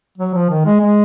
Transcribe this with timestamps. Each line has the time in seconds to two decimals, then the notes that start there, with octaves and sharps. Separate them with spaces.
0.18 F#3
0.34 F3
0.50 D#3
0.66 G#3
0.80 G#3